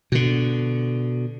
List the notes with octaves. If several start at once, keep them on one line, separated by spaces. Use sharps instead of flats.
B2 D3